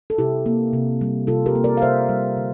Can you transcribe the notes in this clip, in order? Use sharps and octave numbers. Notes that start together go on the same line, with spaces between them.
A4
C3 E4 G4
A#3
C3
G3
C3 F4 A4
G4 A#4
A#3
A#4 D5
F5
C3 C5 E5
G3
D3